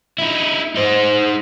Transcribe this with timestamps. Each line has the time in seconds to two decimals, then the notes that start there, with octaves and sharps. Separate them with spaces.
0.19 D#4 E4
0.76 D#4 C5